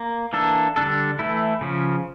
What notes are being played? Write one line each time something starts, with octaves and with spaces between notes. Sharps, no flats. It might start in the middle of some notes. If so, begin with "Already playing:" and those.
Already playing: A#3
E3 A#3 D4 A4
D3 G3 D4 A4
E3 A3 E4
C#3 F3 C#4